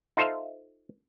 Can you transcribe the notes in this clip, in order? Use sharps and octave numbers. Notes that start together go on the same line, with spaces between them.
D#4 F4 A4 C5 E5 F5